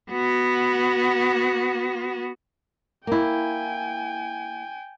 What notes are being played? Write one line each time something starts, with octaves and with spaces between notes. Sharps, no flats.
B3 F#4
A#3 E4 G5 G#5